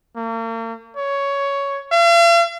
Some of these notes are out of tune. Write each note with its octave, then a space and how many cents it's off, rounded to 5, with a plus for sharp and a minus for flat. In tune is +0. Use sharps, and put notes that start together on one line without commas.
A#3 -40
C#5 +10
F5 -45